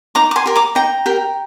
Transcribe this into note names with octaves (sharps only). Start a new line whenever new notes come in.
D#4 A#5 D6
D6
G#5 C6
G4 A#4
A#5 D6
D#4 G5 A#5
G4 A#4